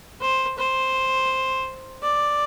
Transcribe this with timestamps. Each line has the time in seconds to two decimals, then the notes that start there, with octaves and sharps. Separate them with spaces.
0.21 C5
0.58 C5
2.03 D5